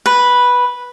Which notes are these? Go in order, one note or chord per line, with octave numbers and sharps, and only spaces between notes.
B4